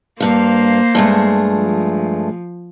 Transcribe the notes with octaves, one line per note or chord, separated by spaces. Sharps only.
G2 A#3 C5 F5
G2 G#3 A3
F3